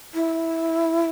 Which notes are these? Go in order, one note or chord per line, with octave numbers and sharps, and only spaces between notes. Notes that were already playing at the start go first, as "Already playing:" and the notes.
E4